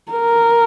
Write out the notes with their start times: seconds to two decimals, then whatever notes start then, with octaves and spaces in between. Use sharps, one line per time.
0.12 A#4